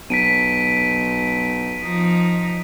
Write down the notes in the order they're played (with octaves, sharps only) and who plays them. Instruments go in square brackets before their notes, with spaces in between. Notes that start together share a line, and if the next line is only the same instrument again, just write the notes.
[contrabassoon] B1 [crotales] B6 D7 D#7
[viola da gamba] F3 D#4